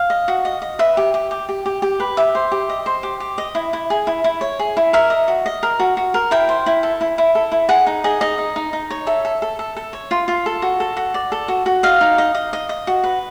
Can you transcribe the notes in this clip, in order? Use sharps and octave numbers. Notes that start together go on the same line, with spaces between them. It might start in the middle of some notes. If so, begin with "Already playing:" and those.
Already playing: F5
D#5
F#4
D#5
D#5
B4 E5
G4
G4
G4
G4
G4
G4
B4
G4 E5
C5
G4
D#5
C5
G4
G4
D#5
E4
E4
G#4
E4
E4
C#5
G#4
E4
A#4 E5
D#5
F#4
D#5
A#4
F#4
F#4
A#4
E4 G5
C5
E4
A4
E4
E4
A4
E4
G#4 F#5
D#4
G#4 D#5
D#4 D#5
D#4
D#4
D#4
C#5
A4 E5
A4
A4
A4
A4
C#5
F4
F4
A4
F#4
A4
F#4
D5
A4
F#4
F#4
D#5 F5
D#4
D#5
D#5
D#5
D#5
F#4
B4